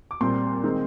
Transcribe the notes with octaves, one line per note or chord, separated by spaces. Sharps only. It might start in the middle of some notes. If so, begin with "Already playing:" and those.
D6
A#2 G3 C4 C6
D#3 G#3 C4